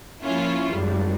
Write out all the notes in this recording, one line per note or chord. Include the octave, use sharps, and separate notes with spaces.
F3 A#3 C#4 E4 F4
G#1 F#2 G3